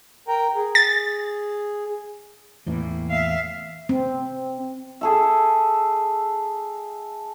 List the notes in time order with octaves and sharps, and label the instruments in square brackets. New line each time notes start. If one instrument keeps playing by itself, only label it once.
[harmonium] A#4 G5 A#5
G#4
[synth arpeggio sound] A6
[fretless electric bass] E2 A2 E3 [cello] A#3
[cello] E5 F5
[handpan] C4
[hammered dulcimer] G#4 A4 E5